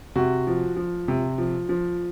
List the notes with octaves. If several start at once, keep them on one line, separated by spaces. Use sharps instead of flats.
C3 F#4
F3
F3
C3
F3
F3